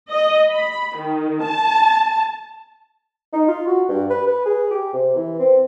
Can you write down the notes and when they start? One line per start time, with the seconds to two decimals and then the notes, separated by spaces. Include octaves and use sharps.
0.10 D#5
0.51 B5
0.95 D#3
1.42 A5
3.33 D#4
3.48 F4
3.67 F#4
3.89 G2
4.10 B4
4.27 B4
4.46 G#4
4.71 G4
4.93 C3
5.16 E3
5.39 C4